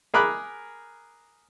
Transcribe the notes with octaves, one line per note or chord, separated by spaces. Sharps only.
G#4 A#4 B5 D6 F#6